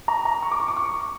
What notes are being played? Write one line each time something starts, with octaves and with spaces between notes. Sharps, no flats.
A#5
A#5
C#6
D6
C#6
D6
C#6